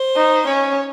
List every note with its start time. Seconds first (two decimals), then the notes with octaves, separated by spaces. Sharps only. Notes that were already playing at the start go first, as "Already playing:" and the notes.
Already playing: C5
0.16 D#4
0.47 C#4 C#5